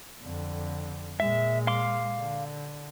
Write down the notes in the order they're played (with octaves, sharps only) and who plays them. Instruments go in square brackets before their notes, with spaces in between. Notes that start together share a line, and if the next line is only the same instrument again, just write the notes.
[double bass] F2 D3
[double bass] A#2 G#3 [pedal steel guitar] E5
[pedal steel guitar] F5 C6 D6
[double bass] D3